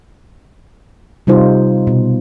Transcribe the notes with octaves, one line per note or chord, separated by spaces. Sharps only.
C3 G3 D#4 F4 C5
B2